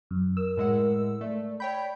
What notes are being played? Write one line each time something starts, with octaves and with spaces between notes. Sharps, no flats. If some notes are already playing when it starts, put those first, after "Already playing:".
F#2
A#4 E6
A2 G#3 F#5
A3 D5
C#5 D5 G5 B5 G6